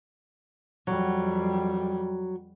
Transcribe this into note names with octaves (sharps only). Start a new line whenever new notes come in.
F2 F#3 G3